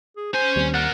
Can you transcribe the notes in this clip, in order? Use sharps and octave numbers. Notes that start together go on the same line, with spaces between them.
G#4
C#4 C5 G#5
D#2 G3 C4
A#4 D5 F#5